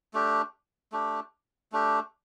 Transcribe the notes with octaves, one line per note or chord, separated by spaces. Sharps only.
A3 D4 G4
A3 D4 G4
A3 D4 G4